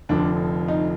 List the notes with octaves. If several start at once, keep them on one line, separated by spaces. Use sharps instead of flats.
F1 F2 D3 F3 D4
D#4